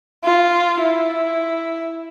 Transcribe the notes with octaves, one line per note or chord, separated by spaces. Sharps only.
F4
E4